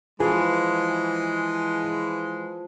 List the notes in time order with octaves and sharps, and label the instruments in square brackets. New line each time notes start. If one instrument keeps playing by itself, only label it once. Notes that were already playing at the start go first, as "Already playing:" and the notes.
[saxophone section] E3 G#3 [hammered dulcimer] F3 [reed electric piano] G#4